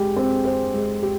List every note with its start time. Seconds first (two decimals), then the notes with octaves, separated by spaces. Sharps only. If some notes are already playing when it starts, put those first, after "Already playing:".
Already playing: G#3 G4
0.16 C4
0.45 C5
0.74 G#3
1.02 G4